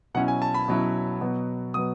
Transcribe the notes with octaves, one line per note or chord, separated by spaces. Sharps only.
B2 F#3 C#4 E4 F#5
G#5
A5
B5
B2 F#3 C#4 E4
B2 F#3 B3
B2 F#3 B3 D#6